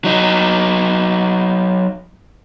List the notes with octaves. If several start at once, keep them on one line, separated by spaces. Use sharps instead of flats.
F#3 D#4